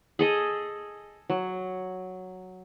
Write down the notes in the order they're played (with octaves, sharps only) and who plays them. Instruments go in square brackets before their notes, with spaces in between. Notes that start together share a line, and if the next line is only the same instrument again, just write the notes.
[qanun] G#4 A4 D#5
F#3